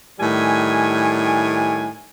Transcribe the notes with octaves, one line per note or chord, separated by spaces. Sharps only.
A2 D#3 G3 G#5